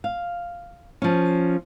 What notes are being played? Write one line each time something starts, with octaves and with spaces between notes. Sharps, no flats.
F5
F3 C#4